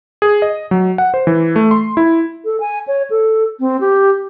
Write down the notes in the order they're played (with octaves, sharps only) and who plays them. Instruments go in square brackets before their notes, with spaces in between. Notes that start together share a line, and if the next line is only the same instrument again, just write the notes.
[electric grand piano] G#4
D#5
F#3
F#5
C5
E3
A3
C6
E4
[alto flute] A4
G#5
C#5
A4
C4
G4